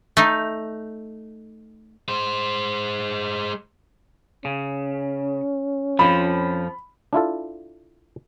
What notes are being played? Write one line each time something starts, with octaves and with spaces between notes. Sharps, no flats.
A3 D#4
G#3 C5
C#3 C#4
F2 F3 B5
D4 E4 F4 A4